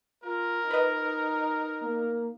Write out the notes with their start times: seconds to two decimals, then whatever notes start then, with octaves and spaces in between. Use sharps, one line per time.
0.24 F4 A#4
0.71 D#4 B4 D#5
1.82 A#3